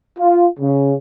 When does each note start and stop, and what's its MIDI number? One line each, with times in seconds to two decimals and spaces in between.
0.19 0.45 65
0.60 0.95 49